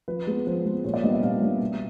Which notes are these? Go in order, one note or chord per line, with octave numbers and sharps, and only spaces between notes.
F3 B4
G#3 B3
F3 C5
G#3 B3
A#2 C#5
D5
G3 B3 D4 D#5
E5
A#2 F5
G3 B3 D4
B2